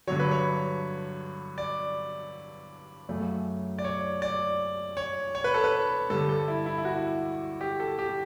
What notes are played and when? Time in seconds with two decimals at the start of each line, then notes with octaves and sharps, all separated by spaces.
0.08 G2 D3 F#3 C#5
0.19 B4
0.31 C#5
1.58 D5
3.09 F#2 C#3 F#3 A3
3.79 D5
3.84 C#5
4.22 D5
4.97 C#5
5.35 C#5
5.44 B4
5.54 A4
5.64 B4
6.10 G2 D3 G3 A4
6.29 A4
6.48 E4
6.66 E4
6.78 E4
6.85 F#4
7.61 G4
7.80 A4
7.99 G4